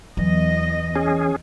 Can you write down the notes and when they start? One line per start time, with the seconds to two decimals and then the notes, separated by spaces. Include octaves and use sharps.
0.17 E2 E3 F#3 D#5
0.95 C#4 G#4